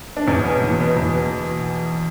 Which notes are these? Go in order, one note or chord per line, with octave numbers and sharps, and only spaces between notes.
D4
E2 C#4
B2
E2
B2
E2
B2